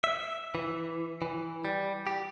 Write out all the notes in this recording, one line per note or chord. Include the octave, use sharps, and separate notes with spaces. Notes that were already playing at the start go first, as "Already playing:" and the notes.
E5
E3
E3
G3
G4